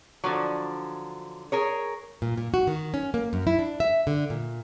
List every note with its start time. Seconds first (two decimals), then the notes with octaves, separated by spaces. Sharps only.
0.24 D3 F3 F#3
1.52 G#4 A#4 C#5
2.22 A#2
2.37 A#2
2.54 F#4
2.67 D#3
2.94 C#4
3.14 A#3
3.33 F#2
3.47 E4
3.59 D4
3.80 E5
4.07 D3
4.30 A#2